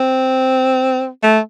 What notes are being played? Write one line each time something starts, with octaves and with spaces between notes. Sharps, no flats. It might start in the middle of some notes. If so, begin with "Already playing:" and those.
Already playing: C4
A3